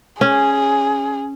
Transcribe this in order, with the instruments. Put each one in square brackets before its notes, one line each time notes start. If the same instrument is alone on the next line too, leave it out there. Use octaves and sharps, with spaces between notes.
[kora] C#4 [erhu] G#4